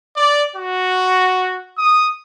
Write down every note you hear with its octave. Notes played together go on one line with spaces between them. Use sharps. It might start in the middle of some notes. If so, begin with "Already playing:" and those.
D5
F#4
D#6